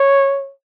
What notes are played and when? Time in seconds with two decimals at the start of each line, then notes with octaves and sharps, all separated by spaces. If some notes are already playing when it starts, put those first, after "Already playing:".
Already playing: C#5